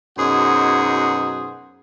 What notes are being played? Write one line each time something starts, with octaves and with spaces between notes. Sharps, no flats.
F#2 B2 D#4 G#4 C5 F#5